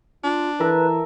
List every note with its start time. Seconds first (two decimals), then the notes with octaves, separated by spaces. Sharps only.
0.24 D4 F4
0.60 E3 A#4 B4 E5 A5